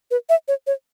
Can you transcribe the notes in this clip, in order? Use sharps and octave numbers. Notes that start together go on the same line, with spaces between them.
B4
E5
C#5
C#5